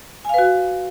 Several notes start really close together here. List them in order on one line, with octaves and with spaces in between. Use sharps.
G#5 F5 B4 F#4